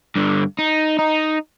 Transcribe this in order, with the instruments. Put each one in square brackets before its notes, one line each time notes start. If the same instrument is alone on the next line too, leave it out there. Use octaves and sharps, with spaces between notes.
[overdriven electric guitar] G2 D3
D#4
D#4